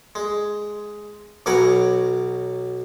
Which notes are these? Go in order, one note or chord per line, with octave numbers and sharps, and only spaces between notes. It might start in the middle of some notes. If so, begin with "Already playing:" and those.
G#3
B1 F#3 A#4 F#5 G#5 B5